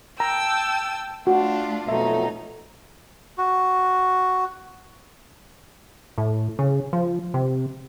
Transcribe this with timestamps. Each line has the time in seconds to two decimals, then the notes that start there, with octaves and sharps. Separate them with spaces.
0.20 G5 A5 A#5 E6
1.27 A3 D4 F4 F#4
1.88 F2 B2 F#3 A3 D#4 E5
3.38 F#4
6.18 A2
6.59 C#3
6.93 F3
7.34 C3